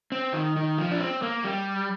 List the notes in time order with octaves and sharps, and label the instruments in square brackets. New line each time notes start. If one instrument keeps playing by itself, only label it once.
[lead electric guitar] C4
D#3
D#3
F3
D4
C4
A#3
G3